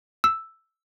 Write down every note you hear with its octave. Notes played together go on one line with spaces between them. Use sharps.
E6